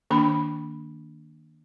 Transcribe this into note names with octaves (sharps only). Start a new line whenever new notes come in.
D#3 A#3 D4 B5